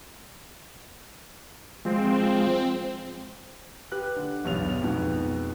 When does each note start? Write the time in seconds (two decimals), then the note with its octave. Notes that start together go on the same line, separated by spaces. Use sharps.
1.85 F3 G#3 C4
3.92 G4 B4 F#6
4.16 D3
4.45 B1 E2 G2 F7
4.69 F7
4.81 F2 G#2 B2